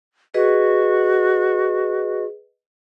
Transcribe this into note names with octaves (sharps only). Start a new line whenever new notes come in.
F#4 G#4 B4 D#5